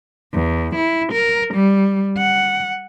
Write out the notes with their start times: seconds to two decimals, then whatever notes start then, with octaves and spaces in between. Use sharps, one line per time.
0.34 E2
0.76 E4
1.13 A#4
1.54 G3
2.18 F#5